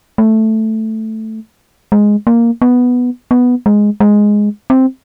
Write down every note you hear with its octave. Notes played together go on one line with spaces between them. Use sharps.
A3
G#3
A#3
B3
B3
G#3
G#3
C4